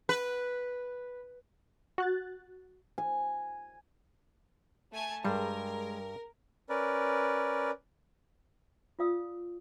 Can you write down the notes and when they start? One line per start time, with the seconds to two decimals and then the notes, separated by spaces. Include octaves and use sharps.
0.09 B4
1.98 F#4 F#6 A6
2.98 G#5
4.93 A3 G#5 A5
5.24 G2 G3 G#3 A#4
6.69 C#4 A#4 B4 D5
8.99 F4 D5 F5 D#6 E6